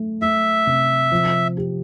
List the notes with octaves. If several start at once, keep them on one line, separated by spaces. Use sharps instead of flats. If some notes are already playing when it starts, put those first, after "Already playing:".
Already playing: A3
A3 E5
C3
F3
G4